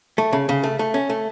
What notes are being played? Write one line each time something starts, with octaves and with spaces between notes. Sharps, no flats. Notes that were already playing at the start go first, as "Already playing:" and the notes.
A3
C#3
C#3
A3
A3
C#4
A3